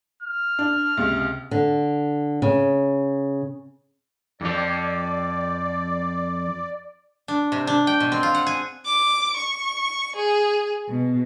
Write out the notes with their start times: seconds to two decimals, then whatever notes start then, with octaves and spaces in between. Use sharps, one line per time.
0.22 F6
0.59 D4
0.97 C#2 C3
1.51 D3
2.42 C#3
4.41 F2 F3 D5
7.28 D4
7.52 C3
7.67 D4
7.87 G5
8.00 B2
8.12 C4
8.23 F4
8.35 F#5
8.47 G#4
8.85 D6
9.36 C#6
10.16 G#4
10.87 B2